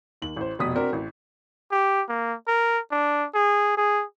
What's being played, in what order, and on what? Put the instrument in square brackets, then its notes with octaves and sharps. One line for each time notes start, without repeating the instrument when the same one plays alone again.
[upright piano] D#2 F#7
A1 C5
F1 B2 D#6 B6
C4 D4 F#4 A#4
A1
[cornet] G4
A#3
A#4
D4
G#4
G#4